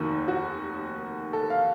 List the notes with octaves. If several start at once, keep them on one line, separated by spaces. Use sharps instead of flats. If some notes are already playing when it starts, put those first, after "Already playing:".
Already playing: F1 D#2 D#3 F#4
F#4
A4
F5